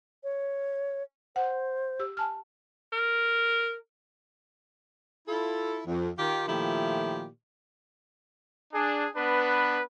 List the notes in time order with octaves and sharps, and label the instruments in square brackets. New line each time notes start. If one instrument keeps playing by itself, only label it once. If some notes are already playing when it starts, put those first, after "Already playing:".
[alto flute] C#5
[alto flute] C5 [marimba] F#5
[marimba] G4 E6
G#5 A5 F6
[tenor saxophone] A#4
[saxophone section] E4 F4 A4
F2
D#3 F4 G4
A#2 D#3 F3 A3 E4 G4
[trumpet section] D4 G#4
B3 D4 B4